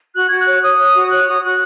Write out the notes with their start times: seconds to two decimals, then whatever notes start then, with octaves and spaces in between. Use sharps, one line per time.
0.15 F#4 F#6
0.28 F#4 G#6
0.41 F#6
0.48 C#5
0.63 C#5 D#6
0.79 C#5
0.96 F#4
1.11 C#5 F#6
1.28 F#4 D#6
1.43 F#4 F#6